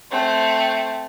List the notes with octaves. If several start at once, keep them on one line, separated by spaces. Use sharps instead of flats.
A3 C4